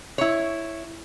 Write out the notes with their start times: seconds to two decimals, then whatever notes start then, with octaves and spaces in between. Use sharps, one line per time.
0.18 E4 C#5